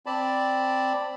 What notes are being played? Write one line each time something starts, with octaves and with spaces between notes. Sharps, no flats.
C4 D5 A5 B5